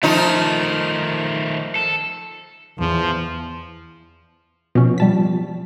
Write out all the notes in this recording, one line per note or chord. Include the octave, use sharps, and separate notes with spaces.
D#3 F3 A3 D#4 F4
A4
E2 F3
B2 F3 C#4
G3 A5 B6